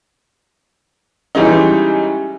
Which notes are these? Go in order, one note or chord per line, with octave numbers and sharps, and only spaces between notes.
E3 G3 G#3 C#4 D#4